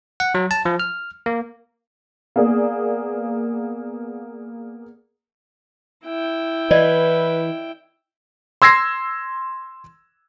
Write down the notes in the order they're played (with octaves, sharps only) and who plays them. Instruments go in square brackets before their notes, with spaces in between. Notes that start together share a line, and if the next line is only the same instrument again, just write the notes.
[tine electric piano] F#5
F#3
A5
F3
F6
A#3
[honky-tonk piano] A#3 B3 G#4 D5
[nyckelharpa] E4 G5
[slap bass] E3 [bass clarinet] B4 [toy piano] D5 D#5
[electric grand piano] C6 E6 G#6 A#6 C7